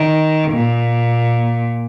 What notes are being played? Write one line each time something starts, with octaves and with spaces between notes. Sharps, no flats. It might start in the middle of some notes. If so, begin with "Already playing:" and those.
Already playing: D#3
A#2